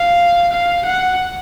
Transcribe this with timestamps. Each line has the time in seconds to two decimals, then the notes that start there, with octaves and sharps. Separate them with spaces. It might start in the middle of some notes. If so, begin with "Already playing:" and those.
Already playing: F5
0.52 F5
0.86 F#5